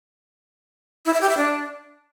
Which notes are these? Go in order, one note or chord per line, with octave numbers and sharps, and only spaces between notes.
E4
E5
G4
E5
D4